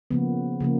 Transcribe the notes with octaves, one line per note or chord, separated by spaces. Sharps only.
C#3 F3 A#3 B3
C#3 F3 A#3